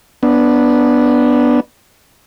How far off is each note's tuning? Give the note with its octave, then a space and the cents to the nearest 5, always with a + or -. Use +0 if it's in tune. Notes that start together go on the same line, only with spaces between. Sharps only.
B3 -10 D4 +0